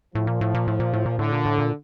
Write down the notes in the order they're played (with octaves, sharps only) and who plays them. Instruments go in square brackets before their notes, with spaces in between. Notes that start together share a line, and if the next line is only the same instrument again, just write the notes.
[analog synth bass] A2 [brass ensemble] F3
[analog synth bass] A#2
A2
A#2
A2
A#2
A2
A#2
[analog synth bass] A2 [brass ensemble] D3
[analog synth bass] A#2
A2
A#2